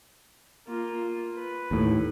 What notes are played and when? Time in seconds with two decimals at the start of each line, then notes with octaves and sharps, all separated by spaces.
0.67 A#3 F4
1.36 B4
1.71 D#2 A2